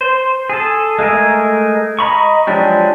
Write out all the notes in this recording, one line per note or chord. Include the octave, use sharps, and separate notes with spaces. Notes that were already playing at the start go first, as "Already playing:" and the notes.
C5
G#4 A4
G#3 A3 G#4 A#4
D#5 A#5 B5 C#6
F3 F#3 G#3 D4 G4